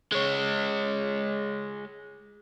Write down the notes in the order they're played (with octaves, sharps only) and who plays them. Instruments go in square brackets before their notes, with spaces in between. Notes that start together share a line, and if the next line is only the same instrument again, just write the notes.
[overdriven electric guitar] G#3 C#5